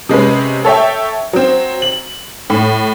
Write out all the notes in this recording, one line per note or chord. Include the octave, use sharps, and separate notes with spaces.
C3 G#3 C#4 B4
A4 C#5 E5 G5
F#3 C4
F#7
A2